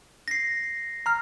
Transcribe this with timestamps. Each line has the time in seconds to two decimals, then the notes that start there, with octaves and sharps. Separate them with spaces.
0.28 A#6 C7
1.06 A#5 F6